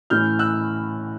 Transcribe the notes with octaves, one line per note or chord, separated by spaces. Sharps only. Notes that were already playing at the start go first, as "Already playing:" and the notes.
A2 E3 A3 C#4 F6 G6
E6 F#6